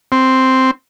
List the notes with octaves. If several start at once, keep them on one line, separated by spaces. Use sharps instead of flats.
C4